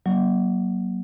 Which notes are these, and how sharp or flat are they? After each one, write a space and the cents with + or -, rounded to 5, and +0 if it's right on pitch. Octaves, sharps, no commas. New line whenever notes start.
F#3 +20 A#3 +30